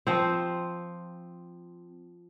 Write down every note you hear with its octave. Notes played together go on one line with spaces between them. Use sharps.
F3 C4